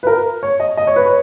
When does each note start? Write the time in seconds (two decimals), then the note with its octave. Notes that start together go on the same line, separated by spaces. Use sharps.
0.03 B4
0.07 A#4
0.43 C#5
0.60 D#5
0.77 D#5
0.87 C#5
0.96 B4
1.06 C#5